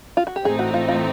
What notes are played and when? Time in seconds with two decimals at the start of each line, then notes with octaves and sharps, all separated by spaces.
0.17 F4
0.27 F#4
0.36 G4
0.45 A2 E3 A3 C4 D#4 G#4
0.59 F#4
0.74 F4
0.88 F4